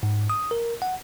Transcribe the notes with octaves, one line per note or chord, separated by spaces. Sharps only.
G#2
D#6
A#4
F#5